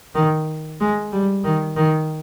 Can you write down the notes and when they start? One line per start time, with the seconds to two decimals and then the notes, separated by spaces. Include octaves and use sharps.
0.14 D#3
0.80 G#3
1.12 G3
1.44 D#3
1.76 D#3